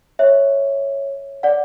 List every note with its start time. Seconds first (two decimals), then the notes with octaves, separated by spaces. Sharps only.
0.19 C#5 E5
1.43 D5 F#5